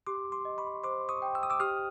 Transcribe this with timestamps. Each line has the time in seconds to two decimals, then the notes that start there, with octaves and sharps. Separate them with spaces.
0.07 G4 C6 D6
0.32 C6 D6
0.45 D#5
0.58 B5 C#6
0.84 C5 C6 D6
1.09 C#6 D#6
1.22 G5
1.35 E6
1.43 D#6
1.50 D6 E6
1.60 G4 D#6 F6